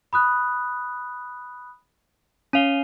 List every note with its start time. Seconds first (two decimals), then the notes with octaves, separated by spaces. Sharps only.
0.13 B5 D#6 F#6
2.53 C#4 F5 D#7 F7 G7